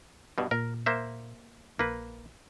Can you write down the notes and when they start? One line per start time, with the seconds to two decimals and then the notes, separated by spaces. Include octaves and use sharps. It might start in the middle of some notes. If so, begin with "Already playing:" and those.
0.38 G2 B2
0.51 A#2 A#4
0.86 A#3 C5 E5
1.79 A#1 A#3 B4